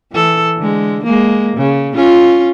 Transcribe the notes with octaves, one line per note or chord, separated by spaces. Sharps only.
E3 A4
D3 G#3
G#3 A#3
C#3
C#4 F4